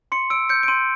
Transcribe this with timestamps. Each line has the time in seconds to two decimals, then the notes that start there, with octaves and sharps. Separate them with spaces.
0.12 C6 C#7
0.30 E6 D7
0.49 G6 C#7
0.63 D7
0.68 C6 D#7